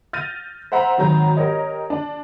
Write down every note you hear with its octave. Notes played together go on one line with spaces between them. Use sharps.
F6 G6 A6 A#6 D#7
C5 E5 F#5 A#5 C6
G#1 D#3 F#3 A#5 G6
G4 A#4 C#5 D#5
D4